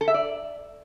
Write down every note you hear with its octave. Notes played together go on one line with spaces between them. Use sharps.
A4
E5
D5